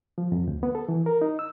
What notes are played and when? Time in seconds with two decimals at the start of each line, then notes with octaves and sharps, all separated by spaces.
0.18 F3
0.32 F2
0.47 D2
0.63 B3
0.75 A4
0.89 E3
1.06 A#4
1.22 D#4
1.39 E6